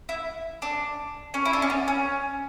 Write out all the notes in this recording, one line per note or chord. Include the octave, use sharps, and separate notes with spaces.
E4
D4
C#4
E4
D4
C#4
B3
C#4